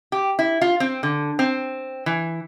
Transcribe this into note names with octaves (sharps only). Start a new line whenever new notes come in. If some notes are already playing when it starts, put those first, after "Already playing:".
G4
E4
F4
C4
D3
C4
E3